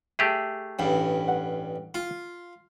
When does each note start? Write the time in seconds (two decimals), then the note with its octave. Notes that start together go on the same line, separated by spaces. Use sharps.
0.19 A3 G4 G#4 E5 A5
0.79 A1 G2 G5
1.28 F#5
1.94 F4